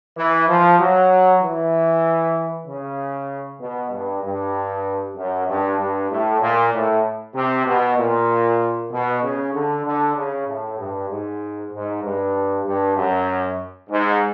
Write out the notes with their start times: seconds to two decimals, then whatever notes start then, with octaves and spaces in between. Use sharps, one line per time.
0.17 E3
0.48 F3
0.79 F#3
1.42 E3
2.66 C#3
3.60 B2
3.91 G2
4.23 G2
5.16 F#2
5.47 G2
5.78 G2
6.10 A2
6.41 A#2
6.73 A2
7.34 C3
7.66 B2
7.97 A#2
8.90 B2
9.22 C#3
9.53 D3
9.84 D3
10.16 C#3
10.47 A2
10.78 G2
11.09 G#2
11.71 G#2
12.03 G2
12.65 G2
12.96 F#2
13.90 G#2